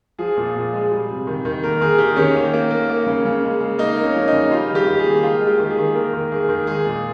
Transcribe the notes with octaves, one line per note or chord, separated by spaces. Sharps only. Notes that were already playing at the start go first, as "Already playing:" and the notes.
F3 G#4
A#2
A#2
G#3
G3
C3
D#3
D#3
A#3 A#4
D#3 G#4
D#3 G4
D#3 C#4
A#3
A#3
A#3
A#3
C#3
C#3
G#3
G#3
A#3 D#4
A#3
C#4
F3 C#4
D#4
C#3
G3 F4
D#3
G4
D#3
G#4
A#3
G#3 F4
G#3
G4
D#3
G#4
D#3
A#3 A#4
D#3
A#3 G#4
D#3
G#3 G#4
A#2